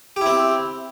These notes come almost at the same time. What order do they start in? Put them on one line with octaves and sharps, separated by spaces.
G4 E4 C4